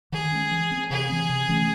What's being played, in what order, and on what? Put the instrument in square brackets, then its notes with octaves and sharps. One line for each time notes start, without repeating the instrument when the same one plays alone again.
[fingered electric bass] D#3 [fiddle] G#4
[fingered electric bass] G#3 C#4
E3
C4
[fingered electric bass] C3 [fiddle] G#4
[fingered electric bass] E3 C4
C3
E3 A3 C#4